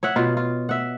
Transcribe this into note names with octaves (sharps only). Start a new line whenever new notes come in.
C#5 E5 F#5
B2 F4
F4
E5 F#5